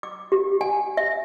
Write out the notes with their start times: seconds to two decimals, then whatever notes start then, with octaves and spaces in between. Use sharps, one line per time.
0.03 D6
0.32 G4
0.61 G#5
0.97 E5